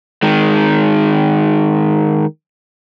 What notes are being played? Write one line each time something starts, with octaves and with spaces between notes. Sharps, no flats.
D#3 G#3